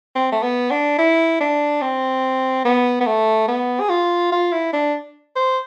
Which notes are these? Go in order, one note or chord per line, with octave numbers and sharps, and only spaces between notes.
C4
A3
B3
D4
E4
D4
C4
B3
B3
A3
B3
G#4
F4
F4
E4
D4
C5